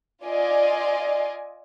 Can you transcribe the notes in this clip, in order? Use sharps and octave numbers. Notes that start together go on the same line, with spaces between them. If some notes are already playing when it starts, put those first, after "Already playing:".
F4 D5 D#5 G#5